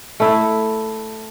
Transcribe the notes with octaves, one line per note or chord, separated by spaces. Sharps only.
A3 E4